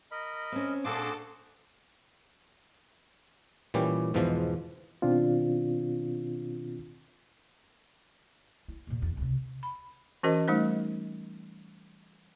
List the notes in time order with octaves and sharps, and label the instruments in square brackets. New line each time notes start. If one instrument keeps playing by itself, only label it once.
[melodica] A#4 D#5 B5
[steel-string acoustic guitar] C4 C#4
[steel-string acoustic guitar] A#2 D4 [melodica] F#4 G#4 C5 [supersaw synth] A4 D6
[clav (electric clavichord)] A#2 E3 G3 C#4 G4
E2 G#2 B2 E3 F3
[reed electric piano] B2 D#3 C4 D4 F4
[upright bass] E4
D#2 A#2
E2 B3
C#2 C3
[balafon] B5
E3 C#4 F#4 A#4 C5 D#5
G3 A3 D#4 C5